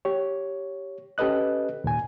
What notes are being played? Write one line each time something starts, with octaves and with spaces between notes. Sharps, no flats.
G4 C#5
C#4 G4 A4 B4 D#5 F#6
D#2 A#2 G#5